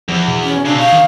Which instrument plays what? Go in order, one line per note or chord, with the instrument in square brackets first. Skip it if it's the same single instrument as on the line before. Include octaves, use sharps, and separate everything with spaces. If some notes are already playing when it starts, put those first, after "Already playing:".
[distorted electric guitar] E2 [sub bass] F3
[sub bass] B2
[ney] C#4
[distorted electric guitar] C#3 C4 [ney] D4
[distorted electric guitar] D#4 C#5 [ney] F5
[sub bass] D#3